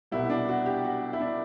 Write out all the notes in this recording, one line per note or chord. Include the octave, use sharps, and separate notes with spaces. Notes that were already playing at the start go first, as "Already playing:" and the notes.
C2 B2 G3 E4
D4
F#4
G4
F#4
E4
D4